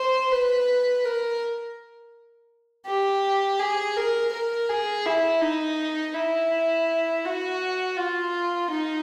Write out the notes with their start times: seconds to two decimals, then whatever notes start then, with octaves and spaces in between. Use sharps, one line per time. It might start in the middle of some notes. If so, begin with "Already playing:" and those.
Already playing: C5
0.31 B4
1.05 A#4
2.87 G4
3.60 G#4
3.96 A#4
4.32 A#4
4.69 G#4
5.06 E4
5.42 D#4
6.14 E4
7.25 F#4
7.96 F4
8.70 D#4